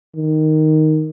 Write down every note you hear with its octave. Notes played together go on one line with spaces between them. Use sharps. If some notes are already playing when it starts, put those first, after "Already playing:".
D#3